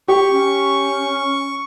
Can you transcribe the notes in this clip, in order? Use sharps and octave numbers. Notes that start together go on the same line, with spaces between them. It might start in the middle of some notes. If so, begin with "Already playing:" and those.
G4 C#6
C#4